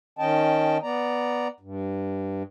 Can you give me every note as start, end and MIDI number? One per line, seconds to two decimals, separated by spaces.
0.19 0.78 51
0.19 0.78 61
0.19 0.78 75
0.19 0.78 79
0.19 0.78 81
0.82 1.48 59
0.82 1.48 74
0.82 1.48 82
1.60 2.43 43